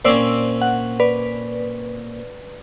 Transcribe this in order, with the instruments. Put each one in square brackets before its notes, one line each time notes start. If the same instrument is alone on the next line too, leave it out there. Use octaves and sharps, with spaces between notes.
[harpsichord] A#2 C4 C#4 [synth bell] C5 D5 E6
[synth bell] F#5
B4 D5